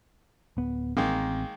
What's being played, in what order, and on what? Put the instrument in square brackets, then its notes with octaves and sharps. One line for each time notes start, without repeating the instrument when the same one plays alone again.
[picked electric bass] D1 B3
[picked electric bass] A1 C4 [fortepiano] D#3 G#3 A#3